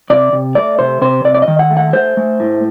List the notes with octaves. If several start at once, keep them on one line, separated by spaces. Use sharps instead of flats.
C3 D5
C3
A3 D5
C3 C5
C3 C5
C3 D5
D5
D#5
D#3
F#5
A3
F#5
A3 C5
A3
A2